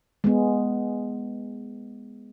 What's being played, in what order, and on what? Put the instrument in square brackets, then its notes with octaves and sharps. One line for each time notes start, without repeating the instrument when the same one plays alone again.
[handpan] G#3 B3